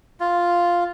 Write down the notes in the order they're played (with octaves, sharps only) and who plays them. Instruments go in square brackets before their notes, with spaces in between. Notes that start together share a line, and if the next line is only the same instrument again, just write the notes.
[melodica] F4